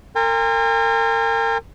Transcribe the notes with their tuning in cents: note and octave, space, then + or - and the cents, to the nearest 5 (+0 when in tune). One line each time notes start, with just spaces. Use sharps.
A#4 -35 G#5 -45 C6 -10